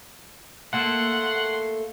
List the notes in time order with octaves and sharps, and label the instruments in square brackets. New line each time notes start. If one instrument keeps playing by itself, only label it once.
[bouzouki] A3 A#3 A4 [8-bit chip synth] F#5 [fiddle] C6